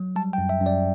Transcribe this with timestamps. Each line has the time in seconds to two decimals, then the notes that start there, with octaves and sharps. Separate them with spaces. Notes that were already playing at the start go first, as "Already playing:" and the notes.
Already playing: F#3
0.16 G3 A5
0.33 G5
0.38 F#2
0.49 E5
0.61 F#2
0.66 D5